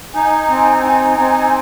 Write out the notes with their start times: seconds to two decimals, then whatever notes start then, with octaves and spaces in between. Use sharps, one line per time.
0.14 D#4 G#5
0.49 C4
0.83 D#4
1.18 C4